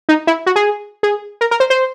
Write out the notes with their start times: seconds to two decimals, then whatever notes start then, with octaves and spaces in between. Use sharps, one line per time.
0.09 D#4
0.27 E4
0.46 F#4
0.56 G#4
1.03 G#4
1.41 A#4
1.51 A#4
1.60 C5
1.70 C5